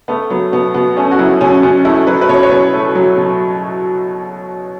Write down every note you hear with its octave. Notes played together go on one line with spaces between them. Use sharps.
A3 B3
F#3 B3
B2 B3
B2 B3
A3 C#4
F#4
F#3 E4
B2 C#4
B2 C#4
A3 E4
F#3 B4
B4
B2 C#5
C#5
B2 B4
A3
F#3
B2